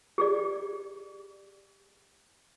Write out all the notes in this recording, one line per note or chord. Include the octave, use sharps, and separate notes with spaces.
G4 G#4 D5